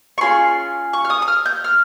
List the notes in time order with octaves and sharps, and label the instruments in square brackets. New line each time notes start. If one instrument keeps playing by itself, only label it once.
[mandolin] C#6
C#4 F4 G#4 C6
C#6
F6
D#6
D#6
F6
G6
F6